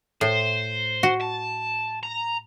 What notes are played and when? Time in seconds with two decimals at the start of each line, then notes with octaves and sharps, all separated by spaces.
0.21 A2 C5
1.03 F#4
1.21 A5
2.03 A#5